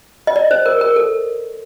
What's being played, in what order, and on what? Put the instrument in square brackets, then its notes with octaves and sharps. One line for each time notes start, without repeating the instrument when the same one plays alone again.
[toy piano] D#5
D5
C5
A#4
A#4
A4